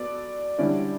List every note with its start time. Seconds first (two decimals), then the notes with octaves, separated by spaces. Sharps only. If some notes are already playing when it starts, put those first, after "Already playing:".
Already playing: B3 F#4 A4 D5
0.58 D3 G3 C#4 E4 D5